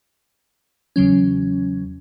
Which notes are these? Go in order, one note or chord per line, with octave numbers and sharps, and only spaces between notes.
E2 C#3 F#3 C#4